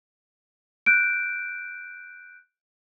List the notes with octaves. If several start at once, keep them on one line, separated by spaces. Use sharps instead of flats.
F#6 G6 D7